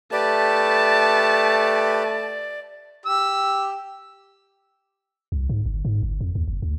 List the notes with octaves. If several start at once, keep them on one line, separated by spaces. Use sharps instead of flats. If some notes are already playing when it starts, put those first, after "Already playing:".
A3 G4 B4 D5 A5
G4 E6
C2
G#2
G1
G#2
G1
F2
D#2
F#1
D2